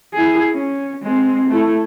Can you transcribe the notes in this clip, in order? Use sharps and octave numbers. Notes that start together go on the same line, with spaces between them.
E4 G#4
C#4
G#3 C4
A3 E4